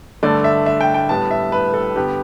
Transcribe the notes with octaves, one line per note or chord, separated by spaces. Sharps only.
G2 D3 A3 D5
E5
E5
G5
G5
A2 G3 B3 A5
E5
B4
A4
G2 D3 B3 G4